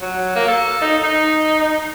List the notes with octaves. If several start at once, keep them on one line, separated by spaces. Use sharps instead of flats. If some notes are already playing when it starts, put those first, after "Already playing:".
F#3
A#3
A4
D#4
D#4